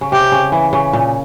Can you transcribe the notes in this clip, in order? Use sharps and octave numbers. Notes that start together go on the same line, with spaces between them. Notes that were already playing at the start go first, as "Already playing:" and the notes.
C#3
C3 G4
C#3
E3
C#3
A#2